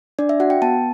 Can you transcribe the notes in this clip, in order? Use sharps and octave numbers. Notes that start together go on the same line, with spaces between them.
D4 D5
E5
F#4 F#5
G5
B3 A5